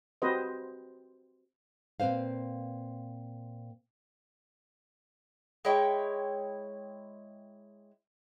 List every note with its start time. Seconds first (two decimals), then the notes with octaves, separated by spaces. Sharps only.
0.22 C4 F#4 G4 B4 C5 D#5
2.00 A#2 C4 B4 C5 F5
5.65 G#3 E4 C#5 G5